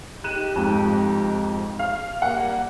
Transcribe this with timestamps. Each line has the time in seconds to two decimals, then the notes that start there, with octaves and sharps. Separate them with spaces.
0.24 D#4 G4 F#6 D#7 E7
0.56 F2 G#2
1.79 F5
2.22 G3 A#3 G4 F#5